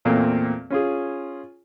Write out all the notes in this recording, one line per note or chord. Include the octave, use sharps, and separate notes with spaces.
E2 A#2 A3 A#3 C4
C#4 F4 G#4